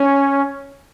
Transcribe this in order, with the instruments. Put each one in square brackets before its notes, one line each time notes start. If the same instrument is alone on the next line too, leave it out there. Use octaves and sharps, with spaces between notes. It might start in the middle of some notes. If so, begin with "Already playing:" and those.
Already playing: [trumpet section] C#4